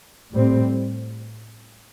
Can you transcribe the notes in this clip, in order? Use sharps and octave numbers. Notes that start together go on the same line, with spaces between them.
A2 G3 C4